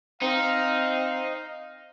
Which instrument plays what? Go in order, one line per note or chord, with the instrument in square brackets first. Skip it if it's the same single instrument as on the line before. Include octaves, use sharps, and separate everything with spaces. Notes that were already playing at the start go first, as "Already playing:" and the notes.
[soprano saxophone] C4 [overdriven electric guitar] D#4 [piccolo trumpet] F5